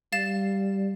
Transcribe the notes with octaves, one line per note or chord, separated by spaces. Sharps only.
G3 F5 A6 E7